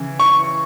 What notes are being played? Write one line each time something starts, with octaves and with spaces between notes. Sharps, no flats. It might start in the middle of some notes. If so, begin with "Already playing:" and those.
Already playing: C#3 E3
C#6